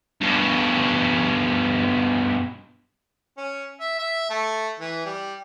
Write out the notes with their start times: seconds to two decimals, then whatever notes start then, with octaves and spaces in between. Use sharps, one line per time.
0.21 G2 B2
3.37 C#4
3.80 E5
3.99 E5
4.30 A3
4.80 E3
5.06 G3